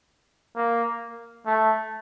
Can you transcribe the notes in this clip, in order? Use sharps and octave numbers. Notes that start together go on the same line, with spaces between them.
A#3
A3